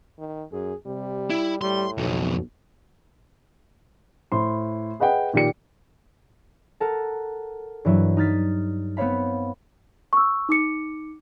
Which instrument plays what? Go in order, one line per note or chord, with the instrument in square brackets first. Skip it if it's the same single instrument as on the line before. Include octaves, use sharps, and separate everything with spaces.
[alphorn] D#3
[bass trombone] F#2 [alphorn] G#4
[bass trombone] C3 [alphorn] G3
[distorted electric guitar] E4
[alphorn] A2 [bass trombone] G3 [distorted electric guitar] C6
[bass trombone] B1 [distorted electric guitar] F2 B2
[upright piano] A2 C5 C6
G#4 B4 D#5 F#5 G5
A#2 D#3 G4 D5 C#7
[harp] A4 A#4 F#5 A5
G2 E3 F#3 E4
D#4 F6 A6 B6
B3 C4 C5 C#5 F5 B5
[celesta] C#6 E6
D#4 D6 C#7